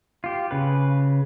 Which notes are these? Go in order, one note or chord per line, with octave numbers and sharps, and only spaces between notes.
F4 G4
C#3 B4